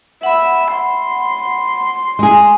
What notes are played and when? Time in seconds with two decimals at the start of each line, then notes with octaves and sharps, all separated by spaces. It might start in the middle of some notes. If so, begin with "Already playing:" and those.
0.23 E5 F#5 B5
0.75 C6
2.19 G#3 G#4